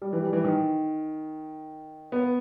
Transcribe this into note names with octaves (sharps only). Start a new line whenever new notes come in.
G3
E3
G3
E3
D#3
B3